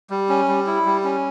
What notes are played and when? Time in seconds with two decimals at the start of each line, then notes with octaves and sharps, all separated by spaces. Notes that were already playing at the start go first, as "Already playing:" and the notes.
0.10 G3
0.29 C#4
0.48 G3
0.67 E4
0.85 G3
1.04 C#4